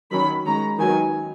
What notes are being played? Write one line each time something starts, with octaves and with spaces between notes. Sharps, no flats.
D#3 F#3 C#4 B5
D#3 G#3 C#4 A#5
D#3 F#3 B3 G#5